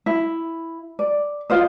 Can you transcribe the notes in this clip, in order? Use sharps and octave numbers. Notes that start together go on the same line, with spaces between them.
E4
D5
F4 C5 D#5